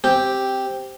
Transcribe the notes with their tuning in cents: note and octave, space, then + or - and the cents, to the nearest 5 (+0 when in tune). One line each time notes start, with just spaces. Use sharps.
C4 +0 G4 +0